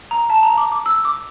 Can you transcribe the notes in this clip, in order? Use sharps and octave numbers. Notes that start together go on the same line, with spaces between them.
A#5
A5
A#5
D6
D6
E6
D6